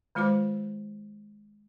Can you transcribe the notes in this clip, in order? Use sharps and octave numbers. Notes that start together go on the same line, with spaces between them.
D#3 G#3 F4 C5 D6